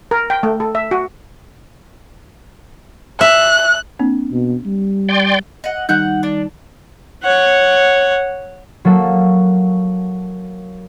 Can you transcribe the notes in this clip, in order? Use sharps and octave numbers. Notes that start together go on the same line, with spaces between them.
A#4
G5
A3
A4
E5
F#4
E5 F#6
A#3 C4 D4
B2
G3
D5 G5 C6
D#5 F#5
D#3 G3 D#4 F#5 F#6 G6
D4
C#5 F#5
F#3 A#3 A4